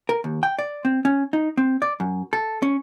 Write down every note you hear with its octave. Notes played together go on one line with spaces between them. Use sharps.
A#4
D#2
G5
D5
C4
C#4
D#4
C4
D5
F#2
A4
C#4